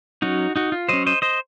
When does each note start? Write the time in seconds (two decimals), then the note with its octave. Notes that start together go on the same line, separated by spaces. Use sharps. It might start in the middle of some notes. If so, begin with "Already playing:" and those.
0.22 F#3 C#4 D#4 F#4
0.56 D#4 F#4
0.72 F4
0.89 F#3 C#4 C5 D#5
1.06 C5 D#5
1.22 C5 D#5